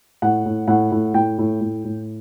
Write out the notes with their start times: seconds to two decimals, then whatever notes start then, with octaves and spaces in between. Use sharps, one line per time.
0.22 A2 F#5
0.46 A2
0.68 A2 F#5
0.92 A2
1.14 A2 G5
1.38 A2
1.61 A2
1.85 A2